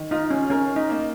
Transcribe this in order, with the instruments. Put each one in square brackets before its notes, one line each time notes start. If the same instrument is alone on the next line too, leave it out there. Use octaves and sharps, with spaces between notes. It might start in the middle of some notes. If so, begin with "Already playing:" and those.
Already playing: [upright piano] D#3
[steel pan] D#4 [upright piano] F4
[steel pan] C#4
[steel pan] C#4 [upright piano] A#4
[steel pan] D#4
[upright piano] A#3